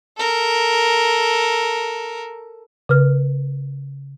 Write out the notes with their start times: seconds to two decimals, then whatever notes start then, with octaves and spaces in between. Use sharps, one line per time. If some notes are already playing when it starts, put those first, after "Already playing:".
0.18 A4 A#4
2.89 C#3 B4 F6